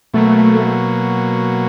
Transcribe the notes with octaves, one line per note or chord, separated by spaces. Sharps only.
B2 F#3 A3 A#3